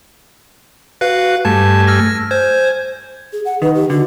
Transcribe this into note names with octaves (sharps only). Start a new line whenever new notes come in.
F#4 B4 F5
G2 A3 G#5 A5
E6 F6 A#6
C5 G#5
G#4
F#5
D#3 B4
G4
D3 F#4